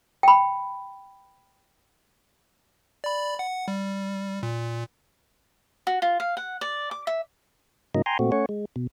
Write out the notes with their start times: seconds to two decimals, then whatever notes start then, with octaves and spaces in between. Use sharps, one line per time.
0.23 G5 B5
3.04 D5 B5
3.39 F#5
3.68 G3
4.43 A#2
5.87 F#4
6.02 F4
6.20 F5
6.37 F#5
6.61 D5
6.91 D6
7.07 E5
7.95 G#2 C#3 F#3 A#3 D#4 D#5
8.06 G5 G#5 A#5 C6
8.19 A#2 A3 C4 F#4
8.32 A3 C#4 C#5 F#5
8.49 G#3
8.76 B2